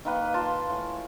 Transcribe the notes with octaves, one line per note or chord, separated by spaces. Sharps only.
D#3 A#3 B4
F4 A5 C6
A2 G#5